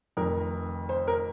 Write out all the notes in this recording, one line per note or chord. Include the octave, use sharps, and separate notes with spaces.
F1 F2 D#3 A#4
C5
A#4